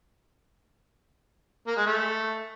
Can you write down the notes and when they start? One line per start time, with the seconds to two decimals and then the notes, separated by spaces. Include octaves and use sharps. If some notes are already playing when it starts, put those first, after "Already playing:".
1.67 A#3
1.77 G#3
1.86 A3